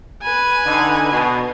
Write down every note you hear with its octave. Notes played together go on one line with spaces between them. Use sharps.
B4 G#5
D3 D#4
B2